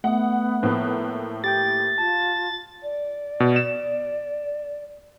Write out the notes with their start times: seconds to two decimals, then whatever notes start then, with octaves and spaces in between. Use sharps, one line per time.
0.04 A3 B3 F#5 D#6
0.63 A2 F3 A#3 B4
1.44 G4 G5 G6 A6
1.98 F4 A5
2.83 D5
3.40 B2
3.56 E7